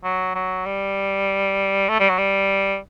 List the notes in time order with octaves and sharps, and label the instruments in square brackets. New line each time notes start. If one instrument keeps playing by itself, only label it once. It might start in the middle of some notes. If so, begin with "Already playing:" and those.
[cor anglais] F#3
F#3
G3
A3
G3
F#3
G3